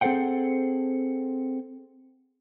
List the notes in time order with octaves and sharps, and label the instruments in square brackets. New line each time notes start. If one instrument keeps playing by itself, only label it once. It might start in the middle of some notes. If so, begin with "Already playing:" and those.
[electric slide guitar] C4 G#4 A4 C5 F#5 G5